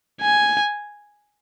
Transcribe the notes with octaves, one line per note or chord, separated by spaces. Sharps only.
G#5